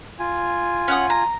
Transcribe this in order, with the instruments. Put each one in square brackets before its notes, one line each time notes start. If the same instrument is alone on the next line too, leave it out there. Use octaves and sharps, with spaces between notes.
[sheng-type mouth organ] F4 G#5
[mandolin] C#4 F#5 D#6
A#5